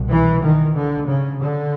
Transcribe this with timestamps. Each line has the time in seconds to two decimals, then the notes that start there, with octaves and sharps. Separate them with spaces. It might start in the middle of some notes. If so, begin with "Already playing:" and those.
Already playing: C2 B2
0.09 E3
0.42 D#3
0.75 D3
1.08 C#3
1.41 D3